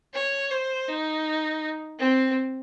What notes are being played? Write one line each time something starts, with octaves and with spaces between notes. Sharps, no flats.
C#5
C5
D#4
C4